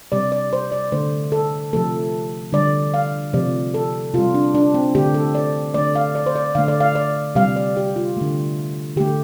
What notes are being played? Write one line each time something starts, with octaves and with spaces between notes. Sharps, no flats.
C3 G3 D5
D5
C5
D5
D3 A3 C5
A4
C3 F3 A3 A4
D3 G3 D5
F5
C3 F3 A3 D5
A4
C3 G3 F4
D4
D4
C4
D3 A3 G4
A4
D5
D3 A3 D5
F5
D5
C5
D5
D3 A3 F5
D5
F5
D5
C3 G3 F5
D5
G4
F4
D3 A3
D3 A3 G4